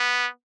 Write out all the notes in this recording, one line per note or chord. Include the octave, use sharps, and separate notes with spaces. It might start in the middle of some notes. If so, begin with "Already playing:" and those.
Already playing: B3